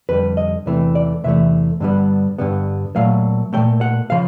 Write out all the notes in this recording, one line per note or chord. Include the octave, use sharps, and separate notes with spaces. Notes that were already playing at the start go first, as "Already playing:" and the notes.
F2 D3 G3 B4
D#5
E2 C3 E3 A3
D5
E2 C3 E3 A3 E5
G2 D3 G3 B3
G2 D3 G3 B3
A#2 F#3 A3 F5
A#2 F#3 A3 G5
F#5
C#3 F3 F5